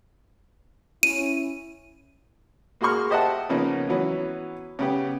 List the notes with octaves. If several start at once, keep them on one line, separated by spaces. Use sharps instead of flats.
C#4 E4 D#7
A#3 F#4 G#4 C6 C#6 F6
G4 C5 D#5 E5 F#5 A5
C#3 F3 A#3 B3 C#4 D#4
E3 F#3 B3 C#4
C#3 B3 G4